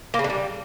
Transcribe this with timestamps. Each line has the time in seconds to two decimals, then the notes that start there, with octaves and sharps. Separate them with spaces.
0.14 A#3
0.19 C#3
0.24 D3
0.30 G3